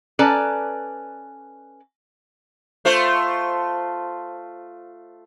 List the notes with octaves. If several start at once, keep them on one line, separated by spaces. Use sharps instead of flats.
C#4 A4 B4 D5 A5 A#5
A3 F4 C5